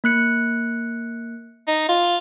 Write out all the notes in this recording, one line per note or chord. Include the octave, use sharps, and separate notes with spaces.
A#3 F#6 C#7
D#4
F4